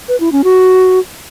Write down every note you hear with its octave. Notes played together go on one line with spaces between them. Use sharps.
B4
E4
C#4
F#4